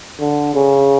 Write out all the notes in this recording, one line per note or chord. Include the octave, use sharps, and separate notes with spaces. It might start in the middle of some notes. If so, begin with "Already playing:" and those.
D3
C#3